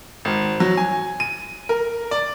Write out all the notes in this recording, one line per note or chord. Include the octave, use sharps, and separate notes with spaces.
G#1
F#3
G#5
D#7
A#4
D5